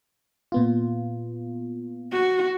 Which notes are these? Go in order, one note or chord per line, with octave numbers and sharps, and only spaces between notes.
A#2 B3 F4
F#4